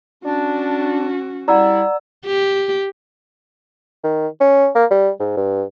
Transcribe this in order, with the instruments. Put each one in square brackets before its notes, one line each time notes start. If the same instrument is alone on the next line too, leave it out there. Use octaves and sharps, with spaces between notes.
[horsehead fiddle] C#4 F#4 [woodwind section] D4
[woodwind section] G3 E4 [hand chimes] D5 E6 [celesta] F#5 A#5
[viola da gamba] G4
[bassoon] D#3
C#4
A#3
G3
G#2
G2